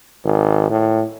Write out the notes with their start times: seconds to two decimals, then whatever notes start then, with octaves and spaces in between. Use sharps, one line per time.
0.24 G#1
0.70 A2